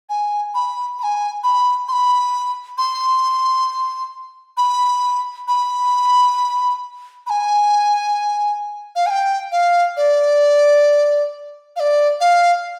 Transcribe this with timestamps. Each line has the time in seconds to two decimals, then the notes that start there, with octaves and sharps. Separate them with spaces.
0.09 G#5
0.54 B5
0.98 B5
1.03 G#5
1.43 B5
1.88 C6
1.92 B5
2.78 C6
4.57 B5
5.48 B5
7.26 B5
7.30 G#5
8.95 F5
9.06 G#5
9.10 G5
9.52 F5
9.97 D5
11.76 F5
11.80 D5
12.20 F5